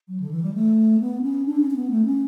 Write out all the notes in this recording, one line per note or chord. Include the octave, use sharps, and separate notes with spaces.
F#3
D3
E3
G3
A3
B3
C#4
D4
C#4
C#4
B3
A3
C#4